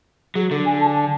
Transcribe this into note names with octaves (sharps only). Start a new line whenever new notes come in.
F#3 G#4
D3 A4
G#5
A5
A5